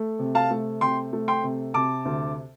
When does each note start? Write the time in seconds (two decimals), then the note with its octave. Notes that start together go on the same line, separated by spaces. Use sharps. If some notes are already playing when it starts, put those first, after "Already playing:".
Already playing: A3
0.19 C3
0.35 F5 A5
0.51 A3
0.81 C3 G5 C6
1.13 A3
1.28 G5 C6
1.43 C3
1.74 C3 A5 D6
2.05 D2